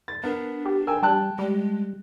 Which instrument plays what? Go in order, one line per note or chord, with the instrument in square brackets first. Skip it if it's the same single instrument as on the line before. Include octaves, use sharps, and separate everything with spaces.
[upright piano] A6
[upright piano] B3 A#4 [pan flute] D4
[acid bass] G4
[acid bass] A#4 [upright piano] G5 G#5 E6
[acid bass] G3 [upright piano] G5 A5 F#6
[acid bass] G3 [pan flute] G#3